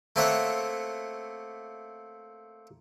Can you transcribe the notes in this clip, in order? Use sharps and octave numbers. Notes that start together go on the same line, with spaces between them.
A3 A#3 C4 C#5 E5 F#5